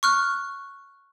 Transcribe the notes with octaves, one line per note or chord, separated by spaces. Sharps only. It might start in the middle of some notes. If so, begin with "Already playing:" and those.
C#6 F6 F#6